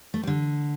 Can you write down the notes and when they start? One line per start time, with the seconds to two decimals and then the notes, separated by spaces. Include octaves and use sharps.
0.14 A3
0.23 G3
0.27 D3